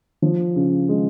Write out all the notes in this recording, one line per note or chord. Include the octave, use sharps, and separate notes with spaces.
F3
C#3
G#3